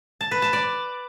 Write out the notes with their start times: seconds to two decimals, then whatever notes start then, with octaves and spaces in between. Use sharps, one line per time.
0.21 A5
0.31 B4
0.42 A5
0.53 D5